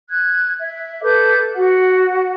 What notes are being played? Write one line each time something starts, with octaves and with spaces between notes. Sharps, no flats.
F#6 G#6
E5
A4 B4 D6 G6
F#4 F#5